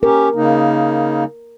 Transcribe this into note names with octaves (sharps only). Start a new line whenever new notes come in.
C#4 G4 A#4
C#3 A#3 D#4